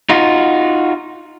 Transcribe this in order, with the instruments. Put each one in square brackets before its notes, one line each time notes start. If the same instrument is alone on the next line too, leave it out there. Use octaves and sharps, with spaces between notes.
[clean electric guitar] D#4 F4 F#4